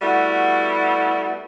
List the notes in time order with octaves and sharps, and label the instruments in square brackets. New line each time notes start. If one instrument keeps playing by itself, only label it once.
[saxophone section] G3 A3 B3 E4 F#4